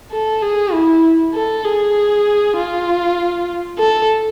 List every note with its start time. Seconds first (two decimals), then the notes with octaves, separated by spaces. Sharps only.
0.12 A4
0.42 G#4
0.73 E4
1.34 A4
1.65 G#4
2.57 F4
3.79 A4